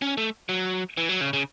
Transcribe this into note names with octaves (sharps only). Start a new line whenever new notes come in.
C#4
A3
F#3
E3
F#3
C#3
C#3